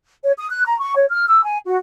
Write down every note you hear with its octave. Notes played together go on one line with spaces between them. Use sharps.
C#5
D#6
F#6
A#5
C#6
C#5
F6
E6
G#5
F#4